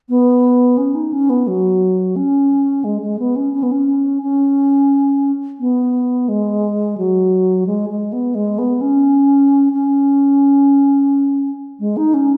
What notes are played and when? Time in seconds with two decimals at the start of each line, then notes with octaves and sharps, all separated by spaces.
0.09 B3
0.77 C#4
0.95 D#4
1.13 C#4
1.29 B3
1.47 F#3
2.16 C#4
2.84 G#3
3.01 G#3
3.19 B3
3.36 C#4
3.54 C#4
3.63 B3
3.71 C#4
4.22 C#4
5.60 B3
6.28 G#3
6.97 F#3
7.67 G#3
7.89 G#3
8.12 B3
8.35 G#3
8.58 B3
8.81 C#4
9.73 C#4
11.80 G#3
11.97 D#4
12.14 C#4